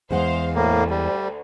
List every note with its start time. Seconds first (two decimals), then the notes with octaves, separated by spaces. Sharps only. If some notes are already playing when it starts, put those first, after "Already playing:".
0.11 E2 G#3 C5 F5 F#5
0.55 D2 A2 A#3
0.90 G3